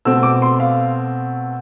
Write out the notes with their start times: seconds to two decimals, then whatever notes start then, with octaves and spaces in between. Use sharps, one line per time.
0.05 B2 A3 C4 E6
0.23 D6
0.42 C6
0.60 F5